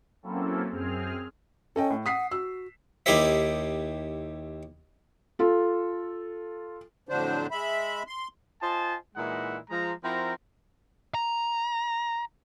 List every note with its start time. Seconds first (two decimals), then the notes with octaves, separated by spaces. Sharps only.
0.23 F#3 A#3 C4 C#4 E4 A4
0.71 F#2 C4 G#4 F6
1.76 C#4 A4 D#5 G5
1.90 A2
2.06 F#5 D#6 B6 C7
2.32 F#4 E6
3.06 D#2 D#4 E4 G4 C5 E5
5.39 F4 A4
7.09 F2 A2 D3 F#3 D4 C5
7.51 G#3 E5 B5
8.07 C6
8.61 F4 C5 D#5 G#5 A5
9.16 A#2 E3 G#3 D#4 E4 F#5
9.70 F3 G#3 A#5
10.03 F3 C4 E4 F#4 A#4 A#5
11.14 A#5